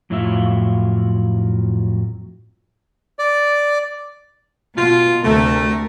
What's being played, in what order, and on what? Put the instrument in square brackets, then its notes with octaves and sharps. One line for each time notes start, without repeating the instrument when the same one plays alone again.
[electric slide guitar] F2 A2 F#3 E4 F4 E5
[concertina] D5
[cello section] B2 [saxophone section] F4
[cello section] D2 C3 A#4 [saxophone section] A3